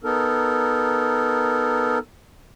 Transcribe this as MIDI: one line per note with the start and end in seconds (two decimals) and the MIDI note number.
0.04 1.98 59
0.04 1.98 63
0.04 1.98 69
0.04 1.98 70